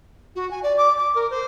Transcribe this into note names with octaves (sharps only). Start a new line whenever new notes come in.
F#4
G#5
D5
D6
D6
A#4
C5